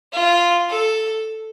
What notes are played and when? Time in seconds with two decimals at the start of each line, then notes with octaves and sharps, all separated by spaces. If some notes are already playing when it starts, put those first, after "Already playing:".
0.13 F4
0.69 A4